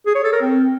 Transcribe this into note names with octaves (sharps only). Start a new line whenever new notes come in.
G#4
C#5
A4
A#4
C4